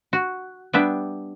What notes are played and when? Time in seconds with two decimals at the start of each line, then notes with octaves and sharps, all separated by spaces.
0.13 F#4
0.73 G3 B3 D4 E5